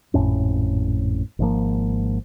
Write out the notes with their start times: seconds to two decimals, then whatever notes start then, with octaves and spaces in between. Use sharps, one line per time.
0.14 G#1 F2 A2 C#4
1.39 G#1 G#2 F3 A#3